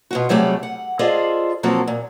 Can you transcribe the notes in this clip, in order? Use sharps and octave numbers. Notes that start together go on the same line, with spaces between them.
B2 F4 F#4
C3 F#3 G3 A3 G4 G#4
F#5
F4 G#4 A4 C5 D5 D#5
B2 F3 F#3 A#3 C4 A4
A#2